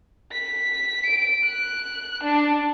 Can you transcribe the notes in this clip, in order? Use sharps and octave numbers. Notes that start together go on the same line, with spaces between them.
B6
D7
F#6
D4